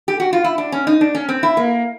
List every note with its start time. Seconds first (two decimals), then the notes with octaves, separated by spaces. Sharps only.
0.08 G4
0.20 F#4
0.33 F4
0.44 E4
0.58 D4
0.72 C#4
0.87 D#4
1.01 D4
1.15 C#4
1.29 C4
1.43 E4
1.57 A#3